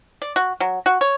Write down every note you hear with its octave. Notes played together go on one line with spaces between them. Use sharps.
D5
F#4
F#3
F#4
C#5